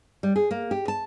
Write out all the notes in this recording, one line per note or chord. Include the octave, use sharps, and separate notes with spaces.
G3
G#4
A#3
G4
A5